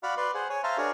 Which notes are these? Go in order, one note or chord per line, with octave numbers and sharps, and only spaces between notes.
F#4 D5 F5 F#5 B5
B4 D5 C6
G#4 C5 F#5
C#5 G#5
C5 E5 F5 A5 A#5 C6
D4 F#4 G#4 A#4 C#5